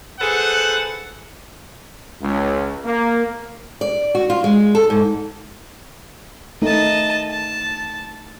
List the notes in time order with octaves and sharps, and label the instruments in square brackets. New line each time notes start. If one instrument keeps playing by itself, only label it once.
[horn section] G#4 A4 B4 C5 F#5
[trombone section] C#2
A#3
[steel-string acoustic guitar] D5
F#4
F4
G#3
A4
G#2
[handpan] A3 D#4 [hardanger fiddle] D#5 A5
[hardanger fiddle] A5